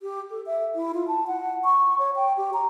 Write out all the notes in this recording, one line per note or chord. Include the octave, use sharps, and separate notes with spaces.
G4
A4
E5
E4
F4
A5
F#5
C#6
C#5
G5
G4
A#5